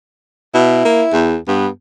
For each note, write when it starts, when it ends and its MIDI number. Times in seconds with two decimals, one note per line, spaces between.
0.54 0.81 47
0.54 1.32 64
0.85 1.03 58
1.12 1.36 40
1.48 1.67 43
1.48 1.68 59